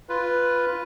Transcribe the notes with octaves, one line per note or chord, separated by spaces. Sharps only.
F4 B4